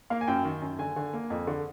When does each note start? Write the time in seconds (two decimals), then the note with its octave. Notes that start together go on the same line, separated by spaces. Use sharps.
0.10 A#3 F5
0.21 G#5
0.27 F#2 G5
0.44 D#3
0.62 F#2
0.79 D3 G#5
0.96 D3
1.13 A#3
1.30 F2
1.47 D3